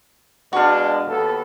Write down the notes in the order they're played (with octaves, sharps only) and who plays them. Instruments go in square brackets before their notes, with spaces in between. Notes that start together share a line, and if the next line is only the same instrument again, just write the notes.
[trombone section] B2 G#3 D4 [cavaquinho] F#4 F5
[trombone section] D#2 B3 A4